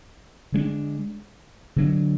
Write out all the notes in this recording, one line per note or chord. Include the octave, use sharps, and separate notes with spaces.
D3 G#3 B3 D4
D3 F#3 B3 D4